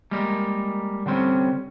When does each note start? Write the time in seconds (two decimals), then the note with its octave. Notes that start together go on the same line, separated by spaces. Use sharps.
0.11 G3 G#3 A#3 A#4
1.06 D3 G3 C4 C#4